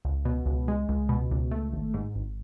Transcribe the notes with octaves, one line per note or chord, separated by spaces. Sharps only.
C#2
B2
C#2
G#3
C#2
B2
C#2
A3
G#1
G#2
G#1